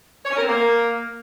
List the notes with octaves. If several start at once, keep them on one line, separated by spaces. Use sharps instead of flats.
C#5
C#4
A#4
C4
A#3